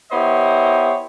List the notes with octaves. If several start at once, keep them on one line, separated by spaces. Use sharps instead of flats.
B3 E4 G4 C5 C#5 D#5